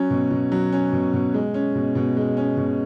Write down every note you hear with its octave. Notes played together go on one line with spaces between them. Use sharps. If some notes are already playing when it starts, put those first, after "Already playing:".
Already playing: F#3 C#4
B2
B2
F#3
C#4
B2
B2
G#3
C#4
B2
B2
G#3
C#4
B2